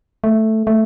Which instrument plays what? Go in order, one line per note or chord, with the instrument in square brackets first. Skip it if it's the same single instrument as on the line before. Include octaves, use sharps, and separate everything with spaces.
[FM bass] A3
A3